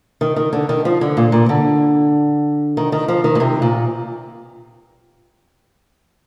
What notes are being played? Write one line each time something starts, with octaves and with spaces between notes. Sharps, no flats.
D#3
D#3
D3
D#3
F3
D3
A#2
A#2
D3
D#3
D#3
F3
D#3
A#2
C3
A#2